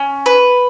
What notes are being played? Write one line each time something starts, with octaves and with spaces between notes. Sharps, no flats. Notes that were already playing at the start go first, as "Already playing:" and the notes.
Already playing: C#4
B4